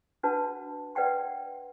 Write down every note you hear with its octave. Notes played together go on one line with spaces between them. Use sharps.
D4 F#4 B4 F#5 A5
B4 D5 F#5 G5 C6